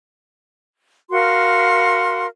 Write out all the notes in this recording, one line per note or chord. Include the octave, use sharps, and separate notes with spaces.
F#4 A#4 F5 C6